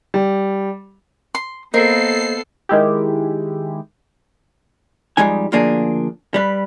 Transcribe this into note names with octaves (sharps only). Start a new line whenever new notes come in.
G3
C6
A#3 B3 A4 A#4 C5 D#5 C7
D#3 G#3 E4 G4
F2 G3 G#3 D#4 G#5
D2 F3 A#3 D4 G#4
G3 B4